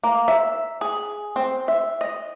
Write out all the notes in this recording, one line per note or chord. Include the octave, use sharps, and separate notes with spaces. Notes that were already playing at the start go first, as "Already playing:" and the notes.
A#3
E5
G#4
C4
E5
D#5